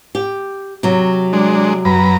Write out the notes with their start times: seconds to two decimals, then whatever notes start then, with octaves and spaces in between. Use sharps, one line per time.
0.15 G4
0.83 C3 F#3
1.33 G#3 D4
1.85 F#2 B4 A#5